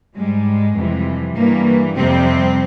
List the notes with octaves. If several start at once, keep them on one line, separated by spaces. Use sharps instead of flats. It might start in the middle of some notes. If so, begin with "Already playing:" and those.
G#2 G3 G#3
F2 C3 E3 G3
G2 E3 G3 A#3
F2 C3 G3 C4